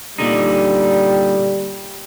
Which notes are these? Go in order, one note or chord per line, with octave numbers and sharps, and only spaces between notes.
A#2 D3 G3 D#4